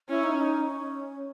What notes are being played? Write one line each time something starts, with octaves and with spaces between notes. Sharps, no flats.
C#4 E4
D#4
D#4
C#4